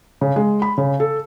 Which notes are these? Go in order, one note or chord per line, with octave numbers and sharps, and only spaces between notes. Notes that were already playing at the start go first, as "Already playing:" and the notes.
C#3
G#3
B5
C#3
A4